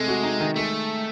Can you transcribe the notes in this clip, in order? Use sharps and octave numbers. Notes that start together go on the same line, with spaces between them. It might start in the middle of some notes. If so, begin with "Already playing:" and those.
Already playing: C3 G#3 A3
F#4
D#4
D#3
G#3 A3